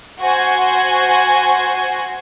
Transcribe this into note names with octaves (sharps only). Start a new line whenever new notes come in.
F#4 C5 F#5 G#5